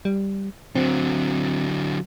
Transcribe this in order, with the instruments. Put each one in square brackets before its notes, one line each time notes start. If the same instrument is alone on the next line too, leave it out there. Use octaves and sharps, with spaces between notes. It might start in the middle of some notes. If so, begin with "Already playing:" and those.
[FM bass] G3
[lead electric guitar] D3 F#3 [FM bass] C4